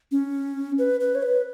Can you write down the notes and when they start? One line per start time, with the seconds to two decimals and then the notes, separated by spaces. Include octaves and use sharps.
0.12 C#4
0.78 B4
1.00 B4
1.15 C#5
1.23 B4